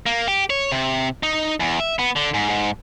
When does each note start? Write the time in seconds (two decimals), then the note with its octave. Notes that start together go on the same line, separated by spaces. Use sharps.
0.06 A#3
0.28 G4
0.50 C#5
0.72 C3
1.23 D#4
1.60 E2
1.80 E5
1.99 B3
2.16 D3
2.34 G#2
2.50 G#2